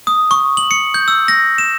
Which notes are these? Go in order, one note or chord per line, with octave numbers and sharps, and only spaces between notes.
D#6
C#6
F#7
C#7
G6
E6
A#6
E7